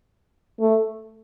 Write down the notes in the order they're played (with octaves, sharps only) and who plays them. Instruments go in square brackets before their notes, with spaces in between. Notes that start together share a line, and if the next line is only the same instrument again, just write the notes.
[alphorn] A3